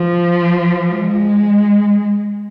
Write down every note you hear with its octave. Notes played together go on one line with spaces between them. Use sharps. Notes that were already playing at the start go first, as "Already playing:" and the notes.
Already playing: F3
G#3